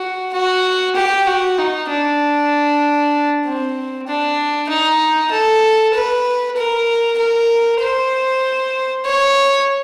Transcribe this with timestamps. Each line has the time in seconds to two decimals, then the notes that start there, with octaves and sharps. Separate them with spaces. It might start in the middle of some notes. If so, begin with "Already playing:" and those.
Already playing: F#4
0.33 F#4
0.95 G4
1.27 F#4
1.58 D#4
1.89 D4
3.45 C4
4.07 D4
4.69 D#4
5.31 A4
5.94 B4
6.56 A#4
7.18 A#4
7.80 C5
9.05 C#5